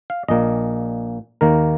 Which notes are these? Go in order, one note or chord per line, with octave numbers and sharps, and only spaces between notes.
F5
A#1 A#2 A#3 D#5
D#2 D#3 A#3 A#4